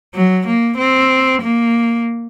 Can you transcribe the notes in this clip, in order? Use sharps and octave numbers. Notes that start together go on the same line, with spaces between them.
F#3
A#3
C4
A#3